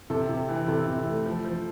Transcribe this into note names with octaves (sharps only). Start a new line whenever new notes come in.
C3 A4
C3
E3
C3 A4
C3
A3
F3
F3